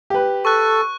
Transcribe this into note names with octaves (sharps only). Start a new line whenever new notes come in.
G4 B4
A4 C#6 F#6